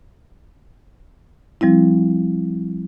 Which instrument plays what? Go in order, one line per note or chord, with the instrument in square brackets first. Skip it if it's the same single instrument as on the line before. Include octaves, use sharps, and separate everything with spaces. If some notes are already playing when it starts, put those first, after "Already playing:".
[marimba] F3 G3 C4 E4